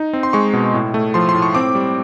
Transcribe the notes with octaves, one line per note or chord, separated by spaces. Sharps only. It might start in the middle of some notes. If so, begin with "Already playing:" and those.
Already playing: D#4
C4
C6
G#3 C#6
B2
A2
A3
F3 C6
C6
A2
C#6
C4 D6
G3